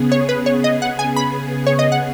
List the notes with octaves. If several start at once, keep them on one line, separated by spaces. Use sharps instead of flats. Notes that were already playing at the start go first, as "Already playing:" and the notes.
Already playing: C#3 B3 G#4
C#5
B4
C#5
D#5
F#5
G#5
B5
C#5
D#5
F#5